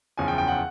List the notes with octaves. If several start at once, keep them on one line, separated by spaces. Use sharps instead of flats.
F#1 E2 C#3 F3 G#5
G5
G5
F#5